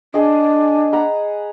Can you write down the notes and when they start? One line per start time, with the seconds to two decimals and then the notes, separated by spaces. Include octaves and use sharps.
0.14 D4 G#4 D#5
0.93 F#5 A#5 B5